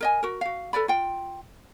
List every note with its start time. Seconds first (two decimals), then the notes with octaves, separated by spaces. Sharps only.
0.01 A#4 D#5 G#5
0.23 F#4 A#4
0.41 F#4 F5
0.73 A4 B4 D5 B5
0.88 F4 G5